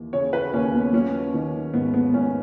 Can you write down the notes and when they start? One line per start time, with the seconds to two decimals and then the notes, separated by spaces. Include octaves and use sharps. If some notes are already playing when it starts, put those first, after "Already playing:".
Already playing: D#2 E3
0.13 C#3 C#5
0.33 B4
0.53 D#2 C#4
0.73 B3
0.93 F#3 C#4
1.34 D#3
1.73 G#2 B3
1.94 B3
2.13 G#2 C#4